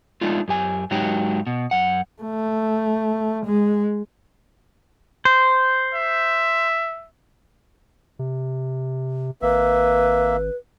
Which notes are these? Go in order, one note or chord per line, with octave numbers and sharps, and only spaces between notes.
G#3 A3 D4 D#4 F4
F#2 G4 G#5
G#2 F#3 G#3 D#4 F#4 G4
B2
F#2 F#5
A3
G#3
C5
E5
C3
G#1 A#3 B4 E5